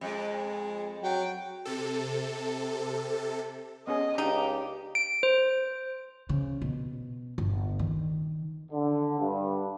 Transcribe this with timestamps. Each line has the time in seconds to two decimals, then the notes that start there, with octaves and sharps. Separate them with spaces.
0.01 F2 G#3
1.02 F#3 G5
1.65 C3 A4
3.87 B3 C#4 G#4 D#5
4.18 C#2 D4 D#4 G4
4.95 D7
5.23 C5
6.29 C#3
6.62 B2
7.38 G1
7.79 D#3
8.72 D3
9.19 G2